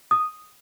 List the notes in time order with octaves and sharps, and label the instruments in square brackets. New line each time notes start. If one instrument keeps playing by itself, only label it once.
[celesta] D#6